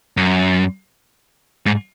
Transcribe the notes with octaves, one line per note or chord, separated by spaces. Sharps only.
F#2
G#2